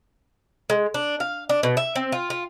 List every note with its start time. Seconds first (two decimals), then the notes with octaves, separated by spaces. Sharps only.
0.70 G#3
0.94 D4
1.20 F5
1.49 D4
1.63 B2
1.77 E5
1.95 C4
2.12 F4
2.30 F4